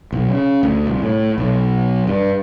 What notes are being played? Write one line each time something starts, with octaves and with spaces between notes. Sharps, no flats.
B1
C#3
D2
C2
A2
B1
G2